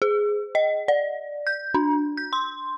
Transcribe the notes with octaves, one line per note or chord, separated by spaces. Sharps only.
G#4
D#5
D5
G6
D4
G6
C6